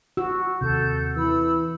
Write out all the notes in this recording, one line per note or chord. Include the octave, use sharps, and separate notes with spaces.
F#4 E6
D#2 C3 A4 G6
E3 B5 E6